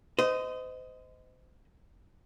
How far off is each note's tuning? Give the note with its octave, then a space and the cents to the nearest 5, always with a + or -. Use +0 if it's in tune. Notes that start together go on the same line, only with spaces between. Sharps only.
C5 -35 D#5 +10